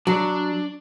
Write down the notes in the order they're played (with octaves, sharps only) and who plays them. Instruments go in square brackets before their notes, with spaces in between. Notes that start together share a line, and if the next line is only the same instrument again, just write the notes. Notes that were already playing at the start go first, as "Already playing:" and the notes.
[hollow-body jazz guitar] F#3 [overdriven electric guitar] D4 D5